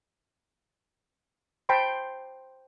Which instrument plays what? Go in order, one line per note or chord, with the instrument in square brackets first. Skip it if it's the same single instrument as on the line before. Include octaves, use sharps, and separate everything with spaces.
[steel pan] C5 G5 A5 B5 C6